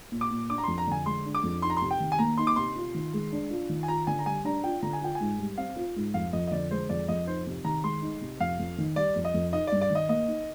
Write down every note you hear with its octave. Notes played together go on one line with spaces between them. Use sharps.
A#2
D6
A#2
D4 D6
A#5
F2 C6
A#5
D3 G#5
G#3 C6
D4
D6
F2
D#4 C6
A#5
C6
C3
G5
D#3
G#5
A#3 A#5
D#4 C6
D6
C3 C6
F4
D#3
G#3
D4
F4
D#3
G#5
F4 A#5
D3 G#5
A#5
G3 G#5
D4 A#5
F4 G5
D3 A#5
G#5
F4 G5
G#2 G#5
G3
C4 F5
F4
G#2
F2 F5
F2 D#5
D#5
D3 D5
G#3 C5
F2 D5
F2 D#5
D#4 C5
C3
D#3 A#5
G#3 C6
D#4
C3
F2 F5
F2
D#3
G3 D5
F2
D#5
F2
D#4 D#5
G2 D5
D5
D#3
D#5
A#3 D#5
D#4